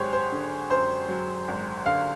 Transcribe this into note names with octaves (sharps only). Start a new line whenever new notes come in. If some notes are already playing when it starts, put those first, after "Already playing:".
Already playing: G#1 F#3 G4 G#4 C5 C#5
C5
D3
F#2 C5
F#3
G#1
D3 F5